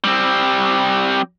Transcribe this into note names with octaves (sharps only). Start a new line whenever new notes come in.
G3 C4